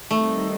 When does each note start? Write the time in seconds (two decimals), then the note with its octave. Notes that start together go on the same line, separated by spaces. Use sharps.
0.11 D#3 G3 A3 C4 D#4